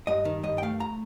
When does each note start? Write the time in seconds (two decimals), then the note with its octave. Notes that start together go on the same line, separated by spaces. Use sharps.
0.07 G2 D#5
0.25 D#3
0.43 G2 D#5
0.58 G5
0.62 A3 F5
0.80 A#5